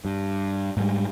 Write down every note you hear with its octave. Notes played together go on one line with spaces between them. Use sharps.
G2
G#2 G3